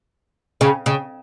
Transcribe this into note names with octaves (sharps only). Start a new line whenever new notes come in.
C#3
C#3